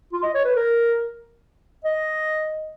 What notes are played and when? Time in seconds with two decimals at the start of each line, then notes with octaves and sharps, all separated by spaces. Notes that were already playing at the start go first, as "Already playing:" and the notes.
0.12 F4
0.23 D#5
0.34 C#5
0.44 B4
0.56 A#4
1.84 D#5